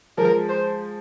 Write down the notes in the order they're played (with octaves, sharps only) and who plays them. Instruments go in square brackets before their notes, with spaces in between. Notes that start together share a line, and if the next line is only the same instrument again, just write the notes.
[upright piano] F3 G#3 [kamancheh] A#4
[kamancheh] C5